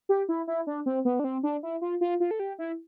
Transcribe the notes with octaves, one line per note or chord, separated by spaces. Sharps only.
G4
E4
E4
D4
C4
B3
D4
C4
D4
E4
F4
F4
F4
A4
G4
E4